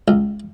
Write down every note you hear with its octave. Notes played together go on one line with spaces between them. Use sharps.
C#2